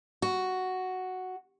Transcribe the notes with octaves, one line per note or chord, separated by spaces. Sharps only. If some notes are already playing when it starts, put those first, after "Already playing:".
F#4